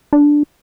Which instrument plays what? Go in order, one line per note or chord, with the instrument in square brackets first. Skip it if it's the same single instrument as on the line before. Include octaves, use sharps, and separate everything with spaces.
[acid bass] D4